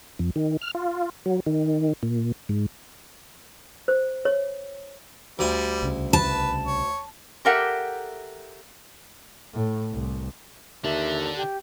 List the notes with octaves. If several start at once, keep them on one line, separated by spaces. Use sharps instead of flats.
F2
D#3
F6
F4
F#3
D#3
A#2
G#2
C5
C#5
D2 G3 G#5
C2 C#3
B4 A5
C#5
G4 A4 A#4 E5 F#5 G5
A2
C2
D#2 D3 D4 E5
G4